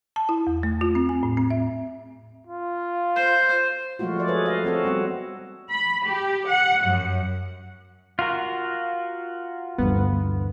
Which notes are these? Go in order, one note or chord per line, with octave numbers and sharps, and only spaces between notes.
A5
E4
E2
A3
F4
C4
G#5
A2
C4
E5
F4
C5
F3 F#3 G#3 A3 F4 F#4
F3 F#3 D5
G#4 A4 B4 C#5
D#5 F5
F#3 C4 F#4 A4
F#3 G3 B3 C4
B5
G4
F#5
F#2
F4 F#4 A#4
D2 G2 E3 B3